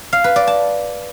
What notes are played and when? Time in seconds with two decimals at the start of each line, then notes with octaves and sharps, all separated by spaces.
0.13 F5
0.24 B4
0.36 D5
0.47 A5